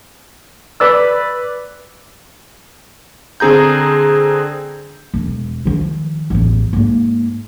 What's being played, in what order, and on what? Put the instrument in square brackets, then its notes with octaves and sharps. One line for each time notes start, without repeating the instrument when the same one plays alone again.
[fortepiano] B4 D5 E6
[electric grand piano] D3 C4 G#4 A#5 G6
[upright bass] E1
D#3 F3
A1 E2
G#2 A#3